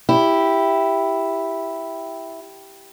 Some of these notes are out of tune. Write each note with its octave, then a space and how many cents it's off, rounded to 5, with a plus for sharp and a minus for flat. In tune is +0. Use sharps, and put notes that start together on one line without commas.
E4 +0 G4 +0